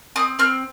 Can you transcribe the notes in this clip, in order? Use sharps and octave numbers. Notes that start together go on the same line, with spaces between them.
C4 D#6
C4 F6